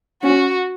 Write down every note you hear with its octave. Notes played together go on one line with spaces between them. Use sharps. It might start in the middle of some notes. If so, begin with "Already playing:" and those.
C#4 F#4